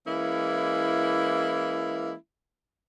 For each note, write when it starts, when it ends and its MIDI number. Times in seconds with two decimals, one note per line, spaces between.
0.07 2.14 52
0.07 2.14 56
0.07 2.14 58
0.07 2.14 61
0.07 2.14 64